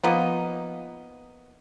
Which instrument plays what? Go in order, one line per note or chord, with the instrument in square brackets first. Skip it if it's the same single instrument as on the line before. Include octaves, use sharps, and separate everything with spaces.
[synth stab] F3 [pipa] A#3 B3 D#4